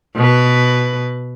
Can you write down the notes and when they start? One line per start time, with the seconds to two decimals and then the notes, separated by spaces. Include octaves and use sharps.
0.16 B2 B4